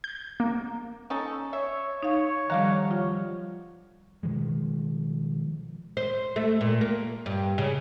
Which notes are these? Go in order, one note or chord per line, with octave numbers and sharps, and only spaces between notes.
G6
A#3
C#4 D#4 A4
C#5 E5
D#4 C#5 F5
D3 D#3 F3 G3 F5 A#5
F4
B2 D#3 F3 G#3
C5
A3
A#2
A#3
G2
C#3